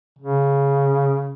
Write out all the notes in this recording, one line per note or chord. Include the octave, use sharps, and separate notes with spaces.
C#3